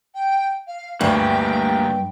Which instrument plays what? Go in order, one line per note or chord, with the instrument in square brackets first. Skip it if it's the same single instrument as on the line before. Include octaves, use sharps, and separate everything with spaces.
[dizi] G5
F5
[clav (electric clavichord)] D2 [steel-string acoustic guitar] G2 [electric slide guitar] A#3 G4 G#5 [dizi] G5